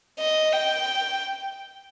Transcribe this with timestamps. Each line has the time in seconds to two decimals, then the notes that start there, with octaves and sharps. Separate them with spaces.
0.20 D#5
0.53 G5